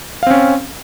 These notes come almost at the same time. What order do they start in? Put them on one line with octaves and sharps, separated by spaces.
F5 C4 C#4